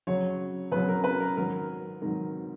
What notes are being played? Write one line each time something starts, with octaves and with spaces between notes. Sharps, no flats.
F#2 C#3 F#3 C#5
F#2 C#3 F#3 B4
A#4
B4
A#4
G#2 D#3 F#3 A#4
G#2 D#3 F#3 A#4